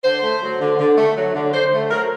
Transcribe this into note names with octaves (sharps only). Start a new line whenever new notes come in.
D3 C5
A3
F#3
D3
D3
A3
F#3
D3
D3 C5
A3
F#3 A#4